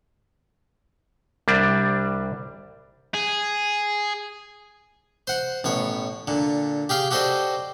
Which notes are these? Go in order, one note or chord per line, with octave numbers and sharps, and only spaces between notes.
C2 G3 D4
G#4
C5 F#5
A1 B2 C#5
A#2 D3
G4 G#4 F5 G5
F#4 G4 A4 C5 D5 D#5